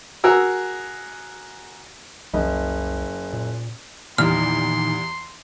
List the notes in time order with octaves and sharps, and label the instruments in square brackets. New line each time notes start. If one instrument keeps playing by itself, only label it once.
[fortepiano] F#4 G#4 A#4 E6
[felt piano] F#1 D#5 [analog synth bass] C2
[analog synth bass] A#2
[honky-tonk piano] E2 G3 [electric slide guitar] A#2 D#3 [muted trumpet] C6 [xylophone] F6